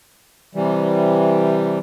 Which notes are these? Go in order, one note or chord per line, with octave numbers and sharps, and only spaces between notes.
C3 E3 G3